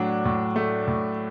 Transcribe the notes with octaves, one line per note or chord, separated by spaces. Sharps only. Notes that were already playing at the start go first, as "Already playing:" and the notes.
Already playing: A2 F#3 D4
A2
A3
A2